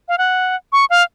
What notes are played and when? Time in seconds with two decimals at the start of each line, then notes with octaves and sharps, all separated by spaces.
0.08 F5
0.18 F#5
0.73 C#6
0.90 F5